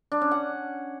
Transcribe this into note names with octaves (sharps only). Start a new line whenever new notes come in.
D4
C#4
F#5